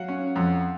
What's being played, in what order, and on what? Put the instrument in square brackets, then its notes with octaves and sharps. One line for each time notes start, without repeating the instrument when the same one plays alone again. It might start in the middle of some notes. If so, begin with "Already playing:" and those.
Already playing: [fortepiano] F#3 [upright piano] F5 F#5
[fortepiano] C#4
F2